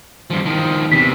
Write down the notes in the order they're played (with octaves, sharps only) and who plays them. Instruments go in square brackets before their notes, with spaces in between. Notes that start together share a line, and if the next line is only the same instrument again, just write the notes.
[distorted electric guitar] G2 F3
D#3 F3
[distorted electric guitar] E2 C3 [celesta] B6